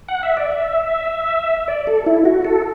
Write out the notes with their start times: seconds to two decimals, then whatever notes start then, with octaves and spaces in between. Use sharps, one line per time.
0.09 F#5
0.23 E5
0.37 D5
0.52 E5
1.68 D5
1.87 A4
2.06 E4
2.25 F#4
2.45 A4